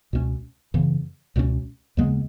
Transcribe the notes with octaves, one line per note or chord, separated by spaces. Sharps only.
C#2 B2 G#3 C#4
F#2 C#3 E3 B3
C#2 B2 F#3 C#4
D#2 C#3 G#3 B3